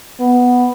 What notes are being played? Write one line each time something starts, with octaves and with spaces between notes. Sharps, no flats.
B3